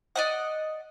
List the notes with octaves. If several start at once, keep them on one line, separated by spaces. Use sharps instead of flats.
D5 D#5 F#5